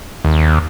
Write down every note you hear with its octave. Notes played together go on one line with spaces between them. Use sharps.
D#2